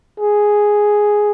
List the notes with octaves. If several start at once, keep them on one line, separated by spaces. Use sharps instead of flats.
G#4